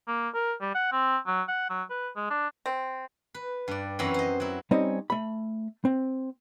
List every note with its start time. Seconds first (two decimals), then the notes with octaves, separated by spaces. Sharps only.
0.08 A#3
0.34 A#4
0.61 G3
0.75 F#5
0.92 C4
1.27 F#3
1.48 F#5
1.70 F#3
1.90 B4
2.16 G#3
2.30 D4
2.66 C4
3.34 B4
3.68 G2 D5
3.99 F#2 E3 C4 C#4 A#5 B5
4.14 C5 D#5
4.40 F#3 E4
4.71 G3 C4 C#4 D#4 D#5
5.10 A3 B5
5.85 C4